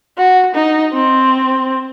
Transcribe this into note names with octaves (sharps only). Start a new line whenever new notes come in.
F#4
D#4
C4